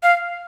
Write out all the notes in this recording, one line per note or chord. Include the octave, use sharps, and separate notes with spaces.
F5